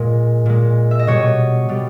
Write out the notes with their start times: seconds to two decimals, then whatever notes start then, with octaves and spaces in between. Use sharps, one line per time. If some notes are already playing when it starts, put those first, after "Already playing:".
Already playing: A#2 G#3
0.46 A#2 G#3
0.91 E5
0.99 D#5
1.07 B2 G3 C#5
1.69 B2 G3